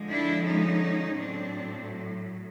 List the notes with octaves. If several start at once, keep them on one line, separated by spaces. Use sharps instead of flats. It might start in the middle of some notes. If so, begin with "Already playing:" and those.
Already playing: D3 F3 G#3
D4 E4
C#4 D#4
A2 F#3 C4 D4